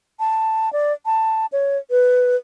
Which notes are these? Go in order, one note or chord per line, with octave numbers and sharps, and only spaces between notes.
A5
D5
A5
C#5
B4